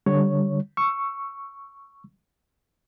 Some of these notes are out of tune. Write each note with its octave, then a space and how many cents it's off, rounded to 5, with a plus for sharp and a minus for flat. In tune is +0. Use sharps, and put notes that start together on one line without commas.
D3 +0 G3 +0 C#5 +0
C#6 +0 E6 +15